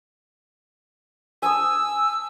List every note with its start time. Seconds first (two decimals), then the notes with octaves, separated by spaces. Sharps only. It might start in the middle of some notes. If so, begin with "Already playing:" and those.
1.42 G#5 A5 D#6 E6